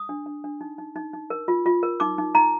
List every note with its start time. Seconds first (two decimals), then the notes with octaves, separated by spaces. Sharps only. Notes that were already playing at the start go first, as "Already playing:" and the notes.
Already playing: D#6
0.09 D4
0.26 D4
0.44 D4
0.61 D#4
0.78 D#4
0.96 D#4
1.13 D#4
1.30 A#4
1.48 F4
1.66 F4
1.83 A#4
2.00 D#4 D6
2.18 D#4
2.35 D#4 A#5